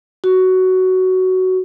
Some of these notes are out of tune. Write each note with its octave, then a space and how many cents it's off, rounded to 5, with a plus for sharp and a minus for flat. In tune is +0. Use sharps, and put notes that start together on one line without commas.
F#4 +10